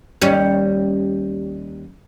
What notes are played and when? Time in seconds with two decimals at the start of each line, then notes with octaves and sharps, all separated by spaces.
0.21 D#2 G3 C#4